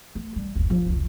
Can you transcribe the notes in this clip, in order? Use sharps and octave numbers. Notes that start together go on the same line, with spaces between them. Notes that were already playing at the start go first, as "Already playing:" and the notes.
A3
D#3 G3
F#1 D2
F3
F1 C#2